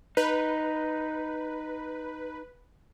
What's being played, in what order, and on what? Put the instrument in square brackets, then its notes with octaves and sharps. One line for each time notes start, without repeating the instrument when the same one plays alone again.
[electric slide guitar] D#4 [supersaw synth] B4